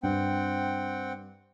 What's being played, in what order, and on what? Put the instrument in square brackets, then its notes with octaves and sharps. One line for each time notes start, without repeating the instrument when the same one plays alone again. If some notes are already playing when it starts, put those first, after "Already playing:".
[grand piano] G2 [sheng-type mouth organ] C4 F#5 G5